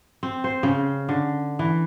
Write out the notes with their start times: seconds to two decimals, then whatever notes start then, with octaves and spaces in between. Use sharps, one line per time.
0.23 C4
0.44 C5
0.63 C#3
1.09 D3
1.59 E3